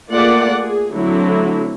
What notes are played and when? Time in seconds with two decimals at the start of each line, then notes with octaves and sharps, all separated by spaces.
0.11 A3 A#3 F4 G#4 D5 F#5
0.57 G#4
0.92 D3 F#3 A3 C4 E4